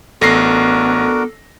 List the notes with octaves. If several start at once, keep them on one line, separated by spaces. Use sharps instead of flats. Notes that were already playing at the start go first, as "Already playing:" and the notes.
A1 B3 D4 F#4 A4 A#4 A#6 C7